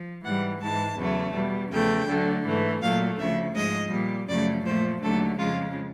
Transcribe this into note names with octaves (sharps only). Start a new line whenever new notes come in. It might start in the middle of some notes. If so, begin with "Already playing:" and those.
Already playing: F3
G#2 E3 G3 F#5
G#2 E3 G#3 A5
E2 C#3 F#3 A3
B2 G3
E2 C#3 F3 A3 G5
D2 D3 F#3 A3
G#2 E3 A3
A#2 F#3 A3 F5
D2 C#3 F3 E5
G#2 F3 G#3 D#5
A#2 G3
F#2 C#3 F3 A3 D5
A#2 F3 A3 C5
D#2 D3 F#3 A3 A4
F2 C#3 F3 G#3 F4